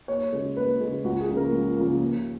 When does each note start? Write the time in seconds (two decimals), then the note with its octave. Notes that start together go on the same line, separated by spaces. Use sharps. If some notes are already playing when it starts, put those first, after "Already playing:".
0.08 D#2 C#5
0.32 C#3 G#3
0.56 D#2 B4
0.80 C#3 G#3
1.04 C#2 F#4
1.21 G#4
1.29 C#3 F3 A#3
1.36 A#4
1.52 C#2
1.77 C#3 F3 A#3
2.00 D#2